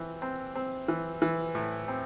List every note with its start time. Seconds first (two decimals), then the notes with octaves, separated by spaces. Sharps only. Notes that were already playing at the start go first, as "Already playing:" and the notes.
Already playing: E3 C4
0.22 C4
0.55 C4
0.88 E3
1.22 E3
1.55 A2
1.88 C4